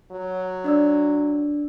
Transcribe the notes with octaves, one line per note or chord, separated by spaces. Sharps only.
F#3
D4 D5 E6